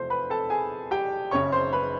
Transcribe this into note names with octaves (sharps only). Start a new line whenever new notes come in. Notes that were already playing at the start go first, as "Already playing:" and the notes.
Already playing: E2 C3 F3 A3 C4 C5 C6
B4 B5
A4 A5
G#4 G#5
G4 G5
F#1 F#2 C#3 C#5 C#6
C5 C6
B4 B5